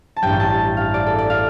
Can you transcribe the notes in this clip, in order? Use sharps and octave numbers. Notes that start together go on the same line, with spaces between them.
A5
A1 G2 G3 G5
A5
F5
D5
A4
D5
F5